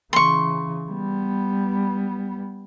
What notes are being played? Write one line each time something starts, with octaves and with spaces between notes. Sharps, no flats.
C#3 E3 C6 C#6
G3 B3